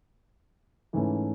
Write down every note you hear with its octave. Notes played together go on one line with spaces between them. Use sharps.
G#2 E3 A3 C#4